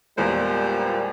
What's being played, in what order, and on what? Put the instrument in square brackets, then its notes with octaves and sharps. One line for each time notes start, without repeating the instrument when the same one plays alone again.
[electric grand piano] E2 G#3 [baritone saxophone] A#2 [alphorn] G3 [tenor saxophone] C5